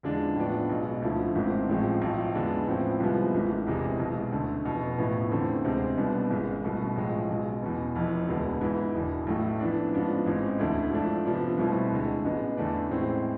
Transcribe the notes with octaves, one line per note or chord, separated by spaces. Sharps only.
E2 D3 F3 G#3 D4
A2 F3 B3 D4
B1 B2 G#3
D2 D3 F3 A3 E4
G#1 G#2 E3 A3 C4
A1 A2 F3 G#3 C4
B1 A2 F3
E2 D3 G#3 B3 D4
A2 F3 G#3 C4 E4
C2 C3 F3 G#3 B3
G#1 G#2 E3 A3
E1 E2 C3 G#3
B1 B2 G#3
D2 D3 A3
F1 E2 B2
A1 A2 F3 B3 E4
E2 D3 A3 C4
D2 C3 G#3 C4
C2 B2 B3 D4
G#1 G#2 G#3
C2 B2 A3
B1 A2 F3 G#3
B1 B2 G#3
E2 B2 B3
F1 F2 E3
E1 D2 D3 G#3 B3
G#2 E3 B3 E4
E1 E2 D3
B1 A2 E3 A3
F2 E3 B3 D4
G#2 F3 B3 D4
A1 G#2 G#3 C4
E1 D2 D3 A3 E4
G#2 F3 A3 D4
F2 C3 F3 B3 D4
C2 B2 A3 C4 E4
D2 D3 G#3
A1 G#2 G#3 B3
E2 D3 A3 D4
A2 G#3 C4 E4